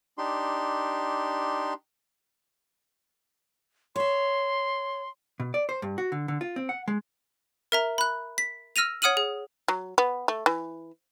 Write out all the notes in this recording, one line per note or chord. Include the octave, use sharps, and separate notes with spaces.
D4 D#4 G4 C6
C#5 E5 C6
B2
D5
C5
G2
F#4
D3
D3
F4
C4
F#5
G#3
A#4 E5 A#5
B5 F#6
B6
E6 F6 A#6 D#7 F7
C#5 F#5 D#6 F6 D#7 F#7
G#4
F#3
B3
A3
E3